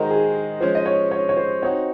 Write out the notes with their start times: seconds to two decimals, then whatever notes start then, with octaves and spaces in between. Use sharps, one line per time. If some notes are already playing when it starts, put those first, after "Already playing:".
Already playing: D#3 G#3 D#4 F#4 A#4 C5
0.10 G#4
0.61 F3 G#3 C#4 C5
0.75 D#5
0.86 C#5
1.11 C#5
1.29 C#5
1.37 C5
1.62 C4 D#4 F#4 C#5